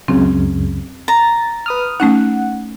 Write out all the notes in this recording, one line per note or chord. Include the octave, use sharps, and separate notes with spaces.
C#2 F#2 C#3 C4
A#5 A6
B4 D#6 F6
A3 C#4 D#4 F#5